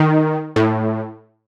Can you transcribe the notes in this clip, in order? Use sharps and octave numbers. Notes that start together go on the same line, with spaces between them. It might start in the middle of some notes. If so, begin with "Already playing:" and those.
Already playing: D#3
A2